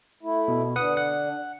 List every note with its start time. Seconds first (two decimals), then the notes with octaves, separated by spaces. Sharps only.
0.23 A3 E4
0.48 B2
0.76 D3 B4 F#5 D#6
0.97 F#5